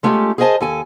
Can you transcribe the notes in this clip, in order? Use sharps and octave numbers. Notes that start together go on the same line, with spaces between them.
G#3 A3 C#4 F4 G4
G#4 A#4 C5 D#5 G#5 A5
D#2 A4 G#5